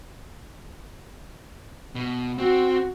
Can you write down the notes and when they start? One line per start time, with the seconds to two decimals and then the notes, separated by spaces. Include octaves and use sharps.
1.95 B2
2.38 C4 F#4